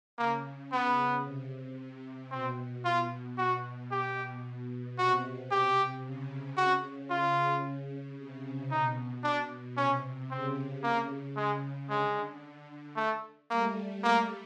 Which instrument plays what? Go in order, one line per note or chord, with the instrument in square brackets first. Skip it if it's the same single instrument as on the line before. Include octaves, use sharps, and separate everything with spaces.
[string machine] C#3 [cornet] A#3
[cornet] B3
[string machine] C3
C3
[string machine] B2 [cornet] C4
[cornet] F4
F#4
G4
[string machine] B2
[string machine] C3 [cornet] F#4
[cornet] G4
[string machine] C#3
[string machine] C#3 [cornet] F#4
[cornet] F4
[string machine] C3
[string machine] B2 [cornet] D#4
[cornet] D4
[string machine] C3 [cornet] C#4
[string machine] C#3 [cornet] C4
[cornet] A#3
G#3
[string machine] D3 [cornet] G#3
[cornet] A3
[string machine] G3 A3 [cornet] A#3
[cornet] A#3